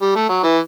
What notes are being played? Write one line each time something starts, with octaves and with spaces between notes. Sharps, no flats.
G3
A3
F#3
E3